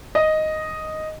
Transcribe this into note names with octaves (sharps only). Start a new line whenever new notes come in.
D#5